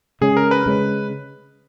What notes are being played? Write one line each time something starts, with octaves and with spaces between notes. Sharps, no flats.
C#3 G#3 C#4 G#4
A#4
B4
C#3 G#3 C#4